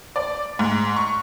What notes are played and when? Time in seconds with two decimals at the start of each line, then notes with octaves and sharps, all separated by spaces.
0.16 D5
0.59 G#2
0.96 C#6